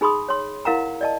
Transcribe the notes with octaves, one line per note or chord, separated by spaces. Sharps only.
D#4 G#4 B5 C6 D#6
C#5 C6
E4 A#4 F5 F#5 A#5
D5 D#5 A5